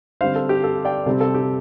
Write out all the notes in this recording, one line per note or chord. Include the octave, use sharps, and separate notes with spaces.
D3 G3 C4 C5 F5
A4
G4
A4
D5 G5
C3 G3 C4 A4
A4
G4